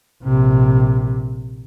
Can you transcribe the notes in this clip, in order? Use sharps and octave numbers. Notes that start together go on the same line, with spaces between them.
A#1 C3